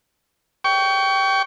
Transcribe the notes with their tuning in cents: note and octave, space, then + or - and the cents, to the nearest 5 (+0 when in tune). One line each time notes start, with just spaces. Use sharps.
G5 -10 C#6 +30